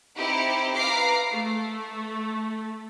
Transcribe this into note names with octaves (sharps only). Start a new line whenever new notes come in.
C4 D#4 E4 G4
B4 F5 A#5 D6 C7
A3